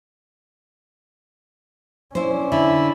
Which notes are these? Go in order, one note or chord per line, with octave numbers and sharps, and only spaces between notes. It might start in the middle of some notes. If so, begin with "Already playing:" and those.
C#4 D4 E4 C5
D3 E4